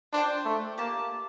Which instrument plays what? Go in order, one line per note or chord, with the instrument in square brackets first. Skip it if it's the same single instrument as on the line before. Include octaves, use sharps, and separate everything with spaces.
[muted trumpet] D4 [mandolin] F4 C5 G5
[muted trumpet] A3
[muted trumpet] A#3 [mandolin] G4 D5 A5